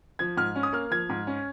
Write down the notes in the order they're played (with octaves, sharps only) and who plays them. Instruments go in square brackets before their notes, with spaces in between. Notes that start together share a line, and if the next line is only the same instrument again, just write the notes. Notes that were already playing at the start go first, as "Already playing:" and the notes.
[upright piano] F3 G#6
G#2 F6
C#4
D#6
A#3 F6
F3 G#6
G#2
C#4